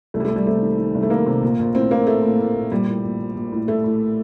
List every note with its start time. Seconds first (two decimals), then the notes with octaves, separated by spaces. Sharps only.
0.14 C2 A3
0.20 G3
0.25 A3
0.30 C2
0.36 G3
0.46 C3 A3
0.62 D#3
0.78 D#3
0.95 C2
1.03 A3
1.10 D#3 A#3
1.26 C3
1.42 A#1
1.59 A#1
1.75 A2 C4
1.91 A2 A#3
2.07 A2 A3
2.23 A2
2.39 A2
2.55 A#1
2.72 A#1 G3
2.87 A2
3.04 A#1
3.20 A#1
3.35 A#1
3.52 A2
3.68 A2 A3
3.84 A2